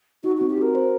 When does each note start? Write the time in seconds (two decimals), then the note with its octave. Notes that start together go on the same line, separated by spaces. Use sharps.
0.24 D#4 F#4
0.37 C4 F#4
0.50 G4
0.58 F#4 A#4
0.75 C5